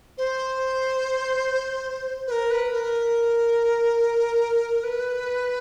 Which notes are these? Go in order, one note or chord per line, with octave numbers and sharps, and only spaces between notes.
C5
B4
A#4
B4
A#4
B4